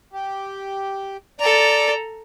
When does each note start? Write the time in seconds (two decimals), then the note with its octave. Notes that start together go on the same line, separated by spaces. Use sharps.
0.13 G4
1.40 A4 D5 A#5